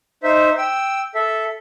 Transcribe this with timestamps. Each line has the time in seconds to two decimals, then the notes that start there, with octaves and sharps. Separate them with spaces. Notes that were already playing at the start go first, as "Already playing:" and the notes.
0.23 D#4 C5 E5
0.58 G5 E6
1.15 A4 E5